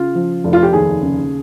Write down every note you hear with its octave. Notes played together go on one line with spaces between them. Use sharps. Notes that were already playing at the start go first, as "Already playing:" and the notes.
Already playing: C#3 F4
F3
F1
F4
G4
D#2 G#4
C#3